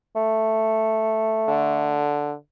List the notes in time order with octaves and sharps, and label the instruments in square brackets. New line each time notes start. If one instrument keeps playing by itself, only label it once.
[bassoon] A3
[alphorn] D3